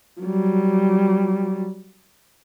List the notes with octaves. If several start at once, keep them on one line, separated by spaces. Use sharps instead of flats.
F#3 G3